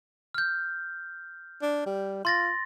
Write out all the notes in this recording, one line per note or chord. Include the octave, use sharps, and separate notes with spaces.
F6 G6
D4
G3
F4 C6 A6 A#6